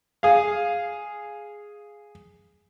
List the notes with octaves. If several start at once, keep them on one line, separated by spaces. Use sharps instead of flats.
G#4 F5